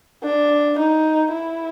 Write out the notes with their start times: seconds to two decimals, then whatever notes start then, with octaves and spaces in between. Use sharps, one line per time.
0.24 D4
0.79 D#4
1.33 E4